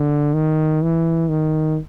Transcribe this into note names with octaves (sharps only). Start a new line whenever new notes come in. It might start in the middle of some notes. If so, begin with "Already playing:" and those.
Already playing: D3
D#3
E3
D#3